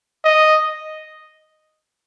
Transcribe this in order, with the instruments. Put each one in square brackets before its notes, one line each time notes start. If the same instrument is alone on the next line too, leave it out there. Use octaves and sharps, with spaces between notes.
[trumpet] D#5